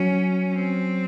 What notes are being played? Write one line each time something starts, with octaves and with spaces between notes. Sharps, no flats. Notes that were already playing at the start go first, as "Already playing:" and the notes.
Already playing: F#3 C#4
C4